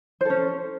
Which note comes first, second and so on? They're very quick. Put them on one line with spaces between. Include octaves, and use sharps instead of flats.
C5 A4 C#4